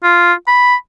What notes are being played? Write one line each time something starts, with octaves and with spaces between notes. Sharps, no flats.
F4
B5